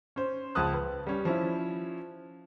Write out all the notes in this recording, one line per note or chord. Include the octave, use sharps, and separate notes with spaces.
C#4 C5
C#2 F3 A5 D#6 F#6
B4
G3 C#4
F3 C#4 E4